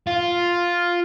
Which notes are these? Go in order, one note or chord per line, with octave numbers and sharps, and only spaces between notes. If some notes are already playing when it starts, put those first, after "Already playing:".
F4